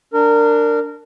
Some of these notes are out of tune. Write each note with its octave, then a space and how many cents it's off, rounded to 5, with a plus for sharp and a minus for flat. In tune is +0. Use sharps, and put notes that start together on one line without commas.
D4 +0 A#4 -20